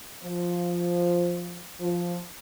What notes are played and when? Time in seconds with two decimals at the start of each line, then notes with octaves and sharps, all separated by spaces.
0.22 F3
1.81 F3